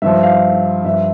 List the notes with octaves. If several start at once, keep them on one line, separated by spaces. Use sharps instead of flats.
G2 F3 E5
F5
G2 F3 E5